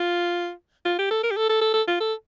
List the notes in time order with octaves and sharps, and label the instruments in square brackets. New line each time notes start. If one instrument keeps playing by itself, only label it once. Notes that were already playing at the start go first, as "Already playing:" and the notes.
Already playing: [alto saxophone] F4
F4
G4
A4
A#4
G4
A4
A4
A4
A4
F4
A4